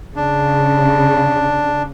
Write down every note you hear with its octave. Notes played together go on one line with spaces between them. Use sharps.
C#3 D4